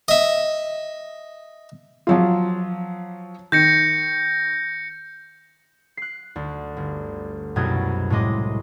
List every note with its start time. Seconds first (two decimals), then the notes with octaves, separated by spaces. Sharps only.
0.08 D#5 E5
2.07 F3 F#3 F4
3.52 D#3 G6 A#6 C#7
5.97 F#6 C7
6.36 D2
6.77 G1
7.56 C2 F#2 B2 G#4 D#5 G#6
8.10 A2 C3 G#3 D#5 D6